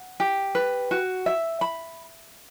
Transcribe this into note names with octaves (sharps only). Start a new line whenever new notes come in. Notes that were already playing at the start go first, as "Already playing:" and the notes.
Already playing: F#5
G4
B4
F#4
E5
B5